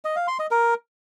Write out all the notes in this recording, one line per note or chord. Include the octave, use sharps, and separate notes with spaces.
D#5
F5
C6
D#5
A#4